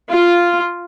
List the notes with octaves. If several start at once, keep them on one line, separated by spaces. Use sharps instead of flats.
F4